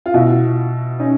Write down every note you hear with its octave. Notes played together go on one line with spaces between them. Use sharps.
F4
B2 E4 F#4
C#4 D#4